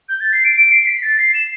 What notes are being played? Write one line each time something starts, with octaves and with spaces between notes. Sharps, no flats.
G6
A6
C7
D7
D7
C7
B6
A6
C7
E7